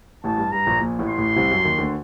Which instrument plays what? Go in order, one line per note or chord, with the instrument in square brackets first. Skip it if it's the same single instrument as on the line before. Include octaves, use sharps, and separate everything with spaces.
[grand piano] A1 A2 [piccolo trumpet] A5
[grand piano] G2
[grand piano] G2 [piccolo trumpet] A#5
[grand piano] A#1 A#2
A#1 A#2
A1 A2
[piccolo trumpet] C6
[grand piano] A1 A2
C2 C3
F#2 F#3
D#2 D#3
D2 D3